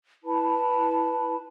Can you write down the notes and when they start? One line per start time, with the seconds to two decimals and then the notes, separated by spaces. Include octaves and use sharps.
0.24 E4 B4 A5 B5